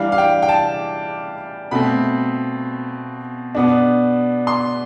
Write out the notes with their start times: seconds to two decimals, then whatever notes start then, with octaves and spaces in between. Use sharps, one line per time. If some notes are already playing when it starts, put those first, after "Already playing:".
Already playing: E3 G3 D4 F5
0.12 F5
0.18 G5
0.42 G5
0.49 A5
1.71 B2 A3 C4 B5
3.55 B2 B3 D4
4.47 C6